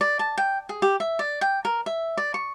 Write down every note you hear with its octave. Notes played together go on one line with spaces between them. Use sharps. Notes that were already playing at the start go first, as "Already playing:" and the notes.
D5
A5
G5
G#4
G4
E5
D5
G5
A#4
E5
D5
C#6